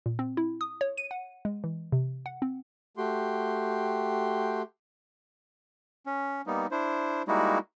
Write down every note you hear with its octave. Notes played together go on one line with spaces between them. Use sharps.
A#2
C4
E4
D#6
C#5
D#7
F#5
G#3
E3
C3
F#5
C4
A3 F#4 G4 G5 C6
C#4
G3 A#3 B3 D#4
D4 E4 C5
G3 G#3 A#3 D#4 E4 F#4